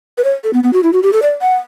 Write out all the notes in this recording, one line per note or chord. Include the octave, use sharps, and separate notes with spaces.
B4
C#5
A4
B3
B3
F#4
E4
F#4
G4
A4
D5
F#5